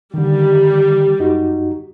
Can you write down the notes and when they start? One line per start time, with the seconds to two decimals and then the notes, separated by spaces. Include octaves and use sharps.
0.14 D3 D#3 G3
1.20 F#2 D#4 F#4